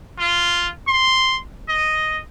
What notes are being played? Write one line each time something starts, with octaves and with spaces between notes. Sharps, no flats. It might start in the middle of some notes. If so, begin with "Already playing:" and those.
F4
C6
D#5